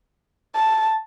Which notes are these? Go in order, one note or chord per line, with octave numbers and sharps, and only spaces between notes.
A5